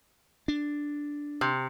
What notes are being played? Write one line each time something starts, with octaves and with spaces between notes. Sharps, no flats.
D4
C3